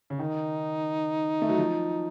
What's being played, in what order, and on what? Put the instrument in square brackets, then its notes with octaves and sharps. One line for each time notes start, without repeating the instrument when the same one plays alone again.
[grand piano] C#3
[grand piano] D#3 [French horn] D#4
[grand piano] A3
F#3
F3